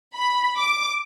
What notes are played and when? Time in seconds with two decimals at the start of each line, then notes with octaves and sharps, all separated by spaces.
0.15 B5
0.56 D6